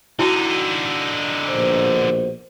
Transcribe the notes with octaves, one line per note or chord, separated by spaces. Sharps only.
D3 D#4 E4 F#4 A5
A#1 B2 C5